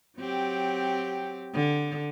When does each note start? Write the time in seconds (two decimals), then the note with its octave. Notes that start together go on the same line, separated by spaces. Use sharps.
0.18 F#3 C4 G4
1.53 D3